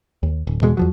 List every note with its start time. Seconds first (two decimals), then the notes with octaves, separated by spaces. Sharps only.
0.23 D#2
0.47 D1
0.62 E2 B2 G#3
0.77 E2 F3 F#3